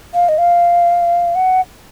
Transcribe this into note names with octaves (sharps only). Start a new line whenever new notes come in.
F5
D#5
F5
F#5